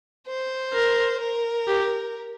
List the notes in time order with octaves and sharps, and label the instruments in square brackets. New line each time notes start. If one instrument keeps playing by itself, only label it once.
[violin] C5
[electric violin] A#4
[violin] A#4
[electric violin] G4